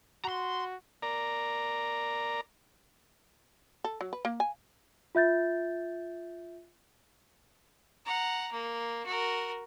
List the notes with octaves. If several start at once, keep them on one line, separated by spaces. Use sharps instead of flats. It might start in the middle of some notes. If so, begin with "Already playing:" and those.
F#4 A#5 C6
A#4 D5 A#5
A4
F#3
B4
A#3
G#5
F4 E5 G6 A6
F#5 A#5
A#3
F#4 A#4